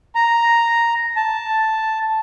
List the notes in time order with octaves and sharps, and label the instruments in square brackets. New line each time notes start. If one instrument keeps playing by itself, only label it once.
[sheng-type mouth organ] A#5
A5